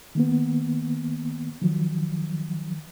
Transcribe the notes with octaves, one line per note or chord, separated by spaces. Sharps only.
D#3 A#3 B3
D#3 F3 F#3